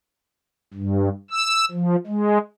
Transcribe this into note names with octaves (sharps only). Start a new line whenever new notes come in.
G2
E6
F3
G#3